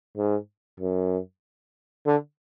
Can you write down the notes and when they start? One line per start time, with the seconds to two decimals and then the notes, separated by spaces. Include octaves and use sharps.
0.17 G#2
0.80 F#2
2.06 D3